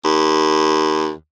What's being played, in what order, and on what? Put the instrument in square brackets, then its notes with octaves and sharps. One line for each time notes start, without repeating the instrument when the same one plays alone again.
[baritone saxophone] D#2